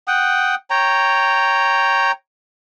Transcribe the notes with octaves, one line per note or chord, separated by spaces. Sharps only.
F#5 G5 D#6
C#5 G5 A#5